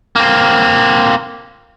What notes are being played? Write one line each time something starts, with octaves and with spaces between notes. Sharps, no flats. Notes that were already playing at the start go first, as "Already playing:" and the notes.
A#3 C4